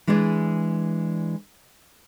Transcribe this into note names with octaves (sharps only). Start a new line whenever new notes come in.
E3 G#3 D4 G#4 D5